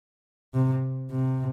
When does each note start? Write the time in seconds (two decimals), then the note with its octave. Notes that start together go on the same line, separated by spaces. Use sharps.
0.54 C3
1.11 C3